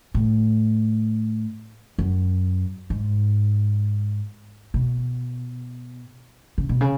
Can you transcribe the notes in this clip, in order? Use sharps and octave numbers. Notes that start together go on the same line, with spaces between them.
A2
F#2
G#2
B2
C#3
B2
C#3